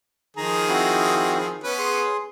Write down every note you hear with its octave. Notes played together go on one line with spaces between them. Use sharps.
D#3 F3 G#4 A#5
C4 E4 F#4
B3 C#4 B4
G#4 C6